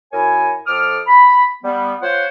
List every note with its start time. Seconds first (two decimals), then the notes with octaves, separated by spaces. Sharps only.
0.13 F#2 E4 A#4 C#5 G#5
0.67 F2 A4 D6 D#6 F6
1.07 B5
1.64 G3 B3
2.02 F4 C5 C#5 F#5